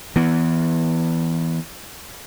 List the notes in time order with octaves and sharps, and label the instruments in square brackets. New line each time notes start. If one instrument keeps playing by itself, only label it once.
[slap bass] E3 B3